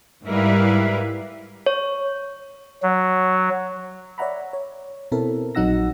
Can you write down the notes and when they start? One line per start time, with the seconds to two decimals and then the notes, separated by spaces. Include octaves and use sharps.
0.24 G#2 G3 E4 A#4 B4 F5
1.66 C#5
2.83 F#3
4.18 C#5 D5 E5 F#5 A#5 B5
4.53 C#5
5.12 B2 C4 E4 A4 A#4
5.55 A#1 F#3 D#4 F#5 E6 A#6